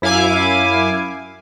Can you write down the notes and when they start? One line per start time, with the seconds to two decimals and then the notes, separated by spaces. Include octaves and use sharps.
0.02 F#2 E4 F5 G#5 D6